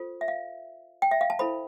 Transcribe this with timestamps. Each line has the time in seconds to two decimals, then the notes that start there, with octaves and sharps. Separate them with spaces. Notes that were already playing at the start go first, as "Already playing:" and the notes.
Already playing: F4 A4 C5
0.21 E5
0.28 F5
1.02 G5
1.11 E5
1.21 F5
1.30 A5
1.39 E4 A4 C5 B5